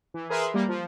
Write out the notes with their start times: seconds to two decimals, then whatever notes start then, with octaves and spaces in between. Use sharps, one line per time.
0.14 E3
0.29 G#4 A#4 B4 E5 C6
0.54 G3 A#3
0.69 F3